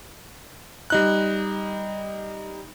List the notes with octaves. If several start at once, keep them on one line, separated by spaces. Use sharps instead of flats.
G3 D#4 F#6